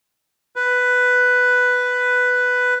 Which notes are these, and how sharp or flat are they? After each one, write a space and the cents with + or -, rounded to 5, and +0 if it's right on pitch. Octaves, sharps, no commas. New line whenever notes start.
B4 +5